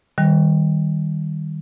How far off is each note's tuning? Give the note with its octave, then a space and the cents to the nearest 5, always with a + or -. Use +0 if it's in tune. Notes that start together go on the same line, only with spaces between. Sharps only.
D#3 +0 G3 +0